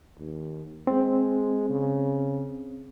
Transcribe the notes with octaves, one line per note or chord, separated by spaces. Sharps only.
D#2
G#3 C4
C#3